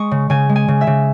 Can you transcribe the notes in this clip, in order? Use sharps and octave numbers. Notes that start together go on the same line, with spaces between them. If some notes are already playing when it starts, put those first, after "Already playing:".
Already playing: G#3 C#6 D#6
C#3
C#3 G#5
G#3
G#5
C#3
E5
C#3